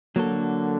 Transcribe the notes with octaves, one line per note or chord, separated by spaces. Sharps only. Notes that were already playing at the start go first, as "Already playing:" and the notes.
D3 F#3 A#3 F#4 A4